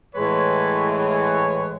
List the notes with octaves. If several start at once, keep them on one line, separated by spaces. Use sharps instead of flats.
A2 E3 G#3 B4 C#5
B4 C#5